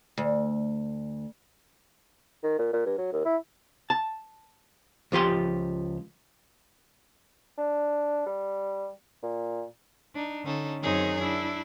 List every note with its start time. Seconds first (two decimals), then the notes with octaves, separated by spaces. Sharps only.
0.18 D2
2.43 D#3
2.58 A#2
2.73 A#2
2.86 G2
2.98 F#3
3.12 D#2
3.25 E4
3.90 A5
5.12 C#2 F3 G4 C6
7.58 D4
8.26 G3
9.23 A#2
10.16 D4 D#4
10.45 D3 C#4 D#4 A4
10.83 F#2 D#3 C4 D#4 G#4 C#5
11.21 D4 E4